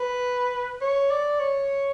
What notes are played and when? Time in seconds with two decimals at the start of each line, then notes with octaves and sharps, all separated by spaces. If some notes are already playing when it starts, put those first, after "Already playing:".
Already playing: B4
0.81 C#5
1.10 D5
1.40 C#5